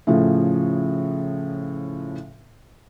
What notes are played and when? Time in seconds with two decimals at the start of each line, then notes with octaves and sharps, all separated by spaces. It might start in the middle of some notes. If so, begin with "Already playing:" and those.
0.07 A2 C#3 F3